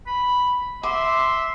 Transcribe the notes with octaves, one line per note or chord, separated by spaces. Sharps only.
B5
E5 C6 D6